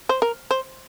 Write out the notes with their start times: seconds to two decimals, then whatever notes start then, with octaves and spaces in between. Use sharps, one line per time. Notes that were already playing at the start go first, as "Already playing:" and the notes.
0.09 C5
0.22 A#4
0.51 C5